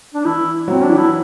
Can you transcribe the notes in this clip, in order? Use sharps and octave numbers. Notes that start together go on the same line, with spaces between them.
D4
E3 E4
F#3
C4
D4
E3
E4